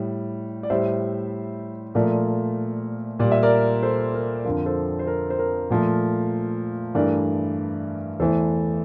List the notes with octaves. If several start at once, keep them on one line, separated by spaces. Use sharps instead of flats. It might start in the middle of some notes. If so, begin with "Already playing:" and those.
Already playing: A2 G3
D5
A2 G3 C5 E5
A#2 F3 A3 A#4 D5
A#2 G3 D5
E5
A#4 D5
A4 C5
A#4
F2 D3 F3 A#4
A4 C5
C5
A#4
C5
A#4
A#2 F3 A3
G2 E3 A3 A#4 D5
E2 E3 A3 A4 C5